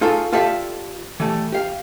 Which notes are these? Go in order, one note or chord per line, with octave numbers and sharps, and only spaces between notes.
D#4 F4 G#4 A4 C#5
F4 G4 A4 D5 E5 F5
E3 G3 A3
G4 F5